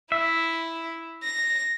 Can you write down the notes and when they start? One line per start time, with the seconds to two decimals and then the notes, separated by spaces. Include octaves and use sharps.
0.12 E4 E5
1.23 A#6